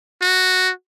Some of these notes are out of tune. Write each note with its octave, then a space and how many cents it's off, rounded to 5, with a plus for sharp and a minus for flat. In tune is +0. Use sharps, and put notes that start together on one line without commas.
F#4 +0